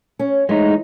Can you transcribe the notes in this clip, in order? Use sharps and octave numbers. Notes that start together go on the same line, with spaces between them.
C#4
E3 G#3 A3 D#4